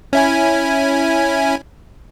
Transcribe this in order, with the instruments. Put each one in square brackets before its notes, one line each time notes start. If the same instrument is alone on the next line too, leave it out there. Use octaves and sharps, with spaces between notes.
[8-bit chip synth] C#4 E4 G#5